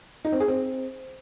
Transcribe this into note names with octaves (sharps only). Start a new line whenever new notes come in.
D#4
C4
G#4
C4